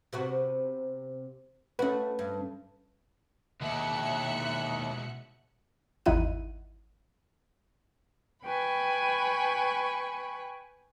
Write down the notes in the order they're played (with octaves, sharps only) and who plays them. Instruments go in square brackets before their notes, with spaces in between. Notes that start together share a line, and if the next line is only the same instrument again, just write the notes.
[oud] C3 B3 F#4
[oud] A3 F#4 [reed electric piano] C#4 B4
[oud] G2
[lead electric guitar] D#2 [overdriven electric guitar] B2 G#3 [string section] E5 F#6 C#7
[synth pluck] G#1 E2 D#4 E4 F#5 D#7
[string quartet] B4 G5 G#5 B5 C#6